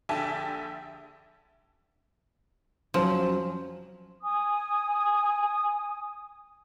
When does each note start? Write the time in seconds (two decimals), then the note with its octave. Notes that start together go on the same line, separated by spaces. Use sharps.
0.09 A#1 D3 G4 E5 G#5 A5
2.94 F2 F3 F#3 C#4
4.22 G#5 D#6